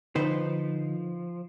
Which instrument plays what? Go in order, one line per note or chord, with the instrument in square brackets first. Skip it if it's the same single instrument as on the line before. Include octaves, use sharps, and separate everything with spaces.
[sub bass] D3 [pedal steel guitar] F3 [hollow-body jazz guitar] D#4 B4 C5